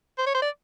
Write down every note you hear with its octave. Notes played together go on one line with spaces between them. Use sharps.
C5
C#5
C5
D5